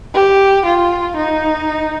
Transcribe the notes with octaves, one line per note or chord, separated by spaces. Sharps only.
G4
F4
D#4